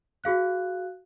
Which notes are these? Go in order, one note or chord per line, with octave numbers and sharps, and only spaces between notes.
F#4 G#4 F5 F#6